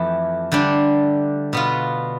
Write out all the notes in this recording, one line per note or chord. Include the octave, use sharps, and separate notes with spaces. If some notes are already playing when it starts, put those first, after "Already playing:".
Already playing: F2 E3 A3 E4 G4
D3 G3 D4
B2 B3 F4